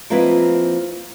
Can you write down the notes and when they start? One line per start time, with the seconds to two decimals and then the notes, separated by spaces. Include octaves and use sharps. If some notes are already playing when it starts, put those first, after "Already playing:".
0.10 F3 A#3 C4 E4 B4 D#5